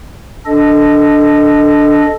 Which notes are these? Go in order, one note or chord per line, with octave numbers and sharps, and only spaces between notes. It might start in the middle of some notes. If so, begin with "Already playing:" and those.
D4 A4 D#5